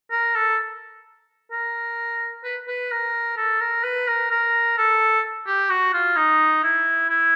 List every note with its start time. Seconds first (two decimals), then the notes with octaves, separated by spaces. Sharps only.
0.11 A#4
0.35 A4
1.51 A#4
2.44 B4
2.68 B4
2.91 A#4
3.37 A4
3.60 A#4
3.84 B4
4.08 A#4
4.31 A#4
4.78 A4
5.47 G4
5.70 F#4
5.94 F4
6.17 D#4
6.63 E4
7.09 E4